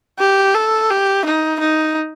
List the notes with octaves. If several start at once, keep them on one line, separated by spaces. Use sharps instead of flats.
G4
A4
G4
D#4
D#4